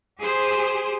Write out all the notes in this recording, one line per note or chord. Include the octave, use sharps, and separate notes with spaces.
G4 G#4 C5